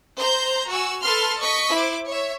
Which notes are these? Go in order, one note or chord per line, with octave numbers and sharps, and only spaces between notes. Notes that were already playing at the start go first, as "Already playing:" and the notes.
C5 A#5 G6
F#4 G#5 E6
A4 B4 A5 C6 F6
D#5 C#6 B6
E4 C5 D6
C#5 E5